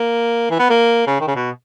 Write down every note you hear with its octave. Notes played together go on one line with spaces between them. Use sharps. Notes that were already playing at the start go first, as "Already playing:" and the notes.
Already playing: A#3
E3
B3
A#3
C#3
D#3
C#3
B2